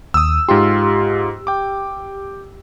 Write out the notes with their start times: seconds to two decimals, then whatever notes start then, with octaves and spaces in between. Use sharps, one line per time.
0.14 D#2 D#6 E6
0.49 G#2 F4 G4 C6
1.47 G5 D6